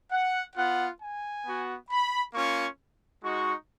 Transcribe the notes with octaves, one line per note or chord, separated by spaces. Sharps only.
F#5
B3 F4 F#5
G#5
B3 F#4
B5
A#3 C#4 F4 C#6
G#3 D#4 F#4 C#6